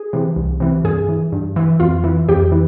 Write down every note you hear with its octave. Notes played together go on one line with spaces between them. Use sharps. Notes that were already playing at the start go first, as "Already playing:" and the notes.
Already playing: G#4
C3 E3
C2
C3 E3
G2 G#4
E3
G2
E3
F2 F4
E3
F2 G4
E3